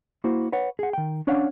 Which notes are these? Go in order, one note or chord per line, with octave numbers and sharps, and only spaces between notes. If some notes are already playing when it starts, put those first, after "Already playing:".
A#3 E4 F#4 C5
B4 C#5 F#5
G#4 F#5
D#3 G5
C#4 D4 C#5 D5 F5 F#5